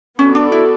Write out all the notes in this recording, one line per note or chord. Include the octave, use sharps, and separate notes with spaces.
B3 C#4 F#4 A4 D5
D4
E4